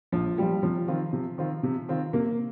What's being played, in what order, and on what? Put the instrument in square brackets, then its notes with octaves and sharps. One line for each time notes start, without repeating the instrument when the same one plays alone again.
[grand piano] A#1 [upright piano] F3
[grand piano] A#2 F3 [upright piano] G3
[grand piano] C3 [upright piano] F3
[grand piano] D#3 C4 F4
C3
D#3 C4 F4
C3
D#3 C4 F4
[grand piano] C3 [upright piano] A#3